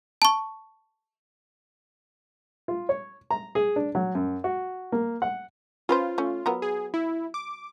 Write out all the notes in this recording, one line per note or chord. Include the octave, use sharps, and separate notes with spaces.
A5 C#6
F4
C#5
A#5
G#4
D4
F#3
F#2
F#4
A#3
F#5
C#4 F4 B4 C5
A3 C#4
F#3 B3 A#4
G#4
E4
D6